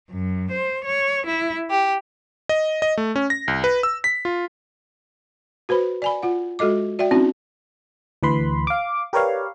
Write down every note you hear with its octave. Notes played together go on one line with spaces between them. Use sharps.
F#2
C5
C#5
E4
G4
D#5
D#5
A3
C#4
A#6
C2
B4
E6
B6
F4
F#4 B4 C5 B5
D5 G#5 B5
F4 F#5
G#3 F#4 A4 D#5 D6
F#4 D5 E5 G5
C4 C#4 D#4 E4 F#4
D2 E3 B4 B5 C6
F5 D6
G4 A#4 B4 C#5 D5 F5